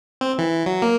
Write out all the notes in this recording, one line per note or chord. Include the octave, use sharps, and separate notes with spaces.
C4
E3
F#3
A#3